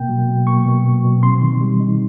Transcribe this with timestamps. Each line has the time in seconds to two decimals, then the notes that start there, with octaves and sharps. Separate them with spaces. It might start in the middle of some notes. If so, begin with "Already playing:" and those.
Already playing: B2 A#3 G5
0.09 F#3
0.28 B2
0.47 A#3 C#6
0.66 B2
0.85 F#3
1.04 B2
1.23 C4 C6
1.42 D#3
1.61 G3
1.80 D#4